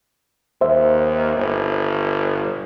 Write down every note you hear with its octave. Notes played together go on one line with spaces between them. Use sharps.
D#2 C5 E5
G1